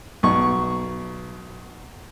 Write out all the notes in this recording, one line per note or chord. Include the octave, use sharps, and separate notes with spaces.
B1 C#6